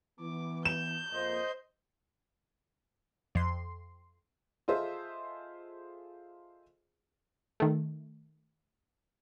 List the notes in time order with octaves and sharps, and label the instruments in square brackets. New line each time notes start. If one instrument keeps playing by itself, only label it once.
[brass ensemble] E3 B3 [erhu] D6
[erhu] G6 [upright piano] E7
[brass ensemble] F2 A#3 [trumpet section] C5 D#5
[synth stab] F2 C6
[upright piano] F4 G#4 A4 C5 D#5 E5
[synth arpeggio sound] D#3 A3